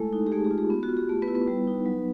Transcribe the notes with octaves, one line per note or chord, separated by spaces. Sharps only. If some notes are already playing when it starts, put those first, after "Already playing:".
Already playing: G#3 A3 E4 A4
D#4
G4
G#3 A3 G#4
G4
F4
G4
B3
F#4
F4
G4
A3 G4
B3 B4
E4
B3 B4
G3
D#4
F#3